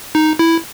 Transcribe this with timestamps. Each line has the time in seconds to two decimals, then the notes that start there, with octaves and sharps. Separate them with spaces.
0.15 D#4
0.39 E4